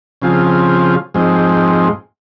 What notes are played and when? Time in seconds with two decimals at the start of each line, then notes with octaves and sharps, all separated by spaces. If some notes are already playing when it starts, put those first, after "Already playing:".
0.22 C#3 F3 C4 F4 G#4
1.14 G#2 F3 G#3 C4